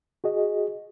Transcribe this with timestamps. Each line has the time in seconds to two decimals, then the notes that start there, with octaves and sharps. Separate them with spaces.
0.24 F#4 G#4 D#5